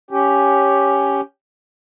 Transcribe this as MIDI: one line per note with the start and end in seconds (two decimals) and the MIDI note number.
0.11 1.21 61
0.11 1.21 67